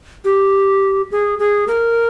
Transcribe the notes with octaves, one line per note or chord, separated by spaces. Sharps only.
G4
G#4
G#4
A#4